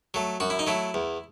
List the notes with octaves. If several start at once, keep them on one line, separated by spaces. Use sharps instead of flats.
F#3 A3
F#2 F#4
E4
D#4
F#3 A3 E4
E2